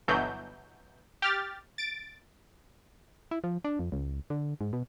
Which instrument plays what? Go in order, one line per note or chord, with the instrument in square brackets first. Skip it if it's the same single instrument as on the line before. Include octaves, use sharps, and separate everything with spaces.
[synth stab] G1 B2 E3 F#3 G6
G4 F6 A6
A6 D7
[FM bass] E4
F3
D4
F2
C#2
D3
G#2
B2